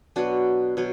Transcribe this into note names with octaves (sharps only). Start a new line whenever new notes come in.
B2 F#3 B3 D4 F#4
B2 F#3